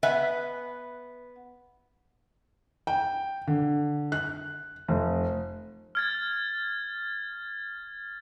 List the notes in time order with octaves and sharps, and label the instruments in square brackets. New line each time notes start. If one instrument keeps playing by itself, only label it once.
[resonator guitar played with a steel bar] B3 B4 E5 G#5
[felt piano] G5
D3
F#6
F1
[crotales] F6 G#6 A6